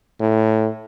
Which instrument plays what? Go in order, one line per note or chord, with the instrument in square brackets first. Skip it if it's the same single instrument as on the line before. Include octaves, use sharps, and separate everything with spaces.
[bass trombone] A2